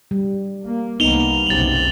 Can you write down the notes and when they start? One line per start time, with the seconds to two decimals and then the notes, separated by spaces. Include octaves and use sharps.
0.11 G3
0.63 A#3
1.00 C2 A#3 B3 D#4 F7 G7
1.47 F#1 B1 C3 A6 F#7